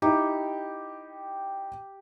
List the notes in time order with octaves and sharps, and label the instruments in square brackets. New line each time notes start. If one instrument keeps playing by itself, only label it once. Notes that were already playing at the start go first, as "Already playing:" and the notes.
[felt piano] D#4 E4 [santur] G4